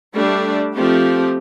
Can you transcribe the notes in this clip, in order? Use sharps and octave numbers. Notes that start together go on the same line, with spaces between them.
G3 A3 D4
F3 A3 C4 G4